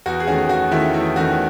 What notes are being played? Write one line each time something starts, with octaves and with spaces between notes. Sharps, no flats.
E2 F#4
G#4
D#3 A3 C#4 F#4
E2 F#4
D#3 A3 C#4 E4
E2 E4
D#3 A3 C#4 F#4